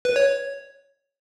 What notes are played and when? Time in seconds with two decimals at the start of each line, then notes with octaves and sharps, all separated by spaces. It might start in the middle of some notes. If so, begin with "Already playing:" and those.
0.05 B4
0.16 C#5